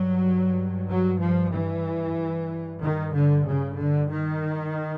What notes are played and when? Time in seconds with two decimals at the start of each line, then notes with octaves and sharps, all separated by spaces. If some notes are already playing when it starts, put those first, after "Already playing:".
Already playing: G2 F#3
0.89 F#3
1.21 F3
1.53 E3
2.17 G2
2.80 D#3
3.13 D3
3.45 C#3
3.77 D3
4.08 D#3